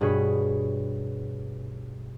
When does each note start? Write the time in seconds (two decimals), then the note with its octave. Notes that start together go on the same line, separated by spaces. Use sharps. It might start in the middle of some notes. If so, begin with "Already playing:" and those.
0.01 G2 B2 G#4 B4 C#5 B6